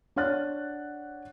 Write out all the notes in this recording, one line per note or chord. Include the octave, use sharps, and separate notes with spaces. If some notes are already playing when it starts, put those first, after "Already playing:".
D4 C#5 F#5 F#6 A6